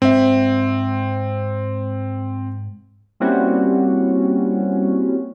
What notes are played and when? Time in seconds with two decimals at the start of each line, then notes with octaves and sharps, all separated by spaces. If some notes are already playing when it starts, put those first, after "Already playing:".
0.02 G#2 C4 E5
3.20 G3 A#3 C4 C#4 E4 F#4